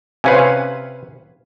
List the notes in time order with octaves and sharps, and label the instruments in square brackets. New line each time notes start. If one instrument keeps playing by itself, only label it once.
[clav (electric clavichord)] C3 C#4 B4 [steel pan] C5 F5 G#5